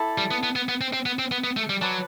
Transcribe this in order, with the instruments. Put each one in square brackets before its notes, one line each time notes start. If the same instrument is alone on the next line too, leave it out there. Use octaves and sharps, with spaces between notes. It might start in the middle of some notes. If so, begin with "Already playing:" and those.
Already playing: [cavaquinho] E4 A4 D5 A5
[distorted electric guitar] G3
B3
B3
B3
B3
C4
C4
B3
C4
B3
B3
A3
G3
[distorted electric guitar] F#3 [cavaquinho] B4 D5 A5 D6